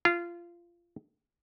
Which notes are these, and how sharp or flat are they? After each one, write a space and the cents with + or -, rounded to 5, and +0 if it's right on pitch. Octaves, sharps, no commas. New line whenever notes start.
F4 -20